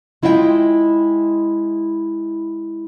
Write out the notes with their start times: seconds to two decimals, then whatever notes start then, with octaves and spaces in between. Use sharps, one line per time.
0.23 G#3 E4 F4 D#5 E5 G5